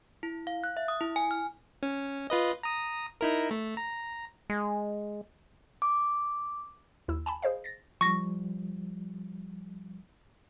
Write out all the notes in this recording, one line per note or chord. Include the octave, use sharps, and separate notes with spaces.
E4
F5
F#6
E5
D#6
E4
G#5
F6
C#4
F4 B4 D#5
A#5 D#6
D#4 E4 A#4
A3
A#5
G#3
D6
D#2 E4 E6
G#5 A5 B5
G#4 C5 D#5 F5
A6 A#6
F3 G3 C#6 A#6